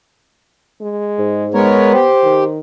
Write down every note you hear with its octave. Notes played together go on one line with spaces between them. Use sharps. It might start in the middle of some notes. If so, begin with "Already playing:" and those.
G#3
G#2
G#3 B3 A#4 C#5
G4 C5
D#3